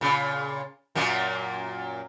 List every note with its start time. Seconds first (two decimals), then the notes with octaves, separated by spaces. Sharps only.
0.01 A#2 C#3
0.95 F#2 A#2 A#3